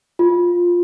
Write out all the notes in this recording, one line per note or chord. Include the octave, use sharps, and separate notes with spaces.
F4